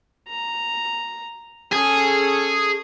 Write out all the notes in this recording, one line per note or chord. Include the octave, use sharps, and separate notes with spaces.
A#5
C#4 G#4 A4